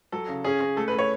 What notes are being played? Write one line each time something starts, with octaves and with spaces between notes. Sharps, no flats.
F#3 A4
C#3
C#4 G#4
C#4
A3 A4
B4
A3
C#5